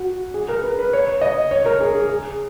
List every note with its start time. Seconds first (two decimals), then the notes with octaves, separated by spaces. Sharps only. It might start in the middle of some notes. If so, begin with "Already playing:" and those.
Already playing: F#4
0.34 G#4
0.49 A#4
0.63 B4
0.79 B4
0.93 C#5
1.21 D#5
1.51 C#5
1.66 A#4
1.80 G#4
1.95 G#4
2.09 G#4